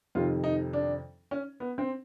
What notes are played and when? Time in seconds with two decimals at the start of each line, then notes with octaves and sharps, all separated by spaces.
0.15 F2 C3 D#3 F4
0.44 D#4
0.73 D4
1.31 C#4
1.60 B3
1.78 C4